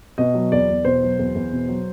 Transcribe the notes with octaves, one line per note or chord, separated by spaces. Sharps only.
B2 D#5
F#3
E2 D5
E2
B2 C5
F#3
E2
E2
B2
F#3